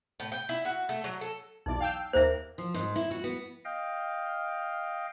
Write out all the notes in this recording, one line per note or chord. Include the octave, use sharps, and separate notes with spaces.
A2
G5
E4
F#4
A3
F#3
A4
B1 E2 D#4 D5
F5 G5 E6
D#2 A#3 C5 E5
F3
G#2
E4
F#4
B3
D#5 F5 G5 F6